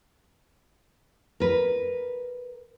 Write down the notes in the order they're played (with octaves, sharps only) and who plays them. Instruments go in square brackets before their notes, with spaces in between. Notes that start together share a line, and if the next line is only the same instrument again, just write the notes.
[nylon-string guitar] A#4 B4